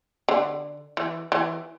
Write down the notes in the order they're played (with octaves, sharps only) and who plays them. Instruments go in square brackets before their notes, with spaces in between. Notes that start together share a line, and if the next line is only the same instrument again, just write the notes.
[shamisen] D3
E3
E3